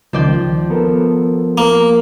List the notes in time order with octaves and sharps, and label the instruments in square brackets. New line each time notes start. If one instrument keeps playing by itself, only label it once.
[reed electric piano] C#2 D#3 [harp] F3 D5 G6
[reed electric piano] B3 A4 A#4
[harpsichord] A#3